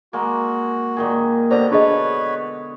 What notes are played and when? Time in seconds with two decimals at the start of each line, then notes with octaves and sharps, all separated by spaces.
0.13 G#3 A#3 F#4
0.97 A#2 D#3 G#4
1.51 B2 D3 G4 C5 D5 A#5
1.71 D4 G#4 B4 C#5 D#5